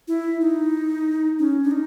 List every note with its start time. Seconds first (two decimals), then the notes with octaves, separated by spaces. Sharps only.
0.08 E4
0.41 D#4
1.39 C#4
1.63 D4
1.71 D#4